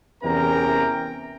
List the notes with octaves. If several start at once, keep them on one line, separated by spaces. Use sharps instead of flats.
E2 C3 C#4 A#4 G5 A#5